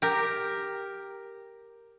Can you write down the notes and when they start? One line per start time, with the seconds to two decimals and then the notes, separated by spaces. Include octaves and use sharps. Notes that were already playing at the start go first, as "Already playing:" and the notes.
0.02 G4 A#4